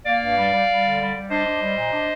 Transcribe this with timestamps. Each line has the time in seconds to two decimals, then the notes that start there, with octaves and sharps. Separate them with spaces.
0.06 A#3 D5 F5
0.22 G2
0.38 G3
0.53 G3
0.68 G3
0.84 D3
1.00 G3
1.15 G3
1.30 D4 C5 D#5
1.46 D4
1.62 G3
1.77 A#2
1.93 D4